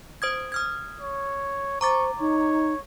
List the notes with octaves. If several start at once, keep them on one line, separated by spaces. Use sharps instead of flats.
C5 D#6 G#6
D#6 F6 G#6
C#5
C5 A#5 C#6 D6 A6
D#4 C#5